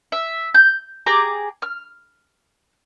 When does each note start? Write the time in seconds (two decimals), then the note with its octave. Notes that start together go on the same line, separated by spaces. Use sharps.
0.12 E5
0.54 G6
1.06 G4 G#4 A#5 D6
1.62 F6